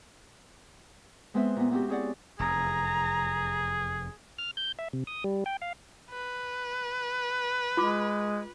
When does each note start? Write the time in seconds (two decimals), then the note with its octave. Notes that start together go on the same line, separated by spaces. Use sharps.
1.34 G#3 B3 C4 B4 C5 E5
1.56 A#2 B3
1.71 B3 C4 F#4 G4
1.88 C4 E4 G#4 C#5 D5 F#5
2.40 F1 E2 G#4 A#5
4.38 F6
4.57 G6
4.79 E5
4.93 C3
5.07 D#6
5.24 G3
5.46 G5
5.62 F5
6.10 B4
7.77 G#3 F4 D6